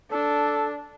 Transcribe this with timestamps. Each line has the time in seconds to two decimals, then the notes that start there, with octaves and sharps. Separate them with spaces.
0.12 D4 A4